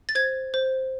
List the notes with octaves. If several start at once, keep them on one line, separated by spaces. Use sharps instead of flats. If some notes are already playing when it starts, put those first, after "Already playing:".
A6
C5 G#6
C5